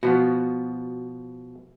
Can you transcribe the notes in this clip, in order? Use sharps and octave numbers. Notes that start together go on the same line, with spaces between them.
B2 F3 B3 F#4